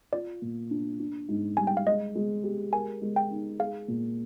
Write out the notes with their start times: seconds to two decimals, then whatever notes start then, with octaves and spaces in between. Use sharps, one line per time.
0.13 F4 D5
0.42 A#2
0.71 D4
1.00 D4
1.28 G#2
1.57 G3 G#5
1.67 G5
1.77 F5
1.86 G#3 D#5
2.15 G#3
2.44 G4
2.73 A#4 G#5
3.02 G#3
3.16 G5
3.30 D#4
3.59 G#4 F5
3.88 A#2